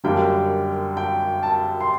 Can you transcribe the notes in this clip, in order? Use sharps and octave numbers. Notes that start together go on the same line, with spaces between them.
F#2 D3 G3 A#3 D4 G5
G5
A5
C6